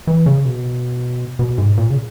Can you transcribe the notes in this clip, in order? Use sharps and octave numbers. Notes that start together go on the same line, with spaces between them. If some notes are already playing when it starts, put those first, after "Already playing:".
E3
C#3
B2
B2
G#2
A#2
C#3